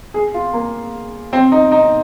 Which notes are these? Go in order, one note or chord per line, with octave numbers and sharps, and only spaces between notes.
G#4
F4
A#3
C4
D#4
D#4